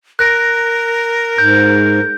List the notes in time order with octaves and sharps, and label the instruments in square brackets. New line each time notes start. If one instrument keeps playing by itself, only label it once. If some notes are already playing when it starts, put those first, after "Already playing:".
[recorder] A#4 [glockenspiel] F#6 A#6 D7
[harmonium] G#2 [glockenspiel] G6